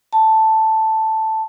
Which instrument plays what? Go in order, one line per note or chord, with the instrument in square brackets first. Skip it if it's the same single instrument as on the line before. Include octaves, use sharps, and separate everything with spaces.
[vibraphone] A5